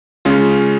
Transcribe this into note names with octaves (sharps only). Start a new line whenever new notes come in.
C#3 G#3 C#4 F4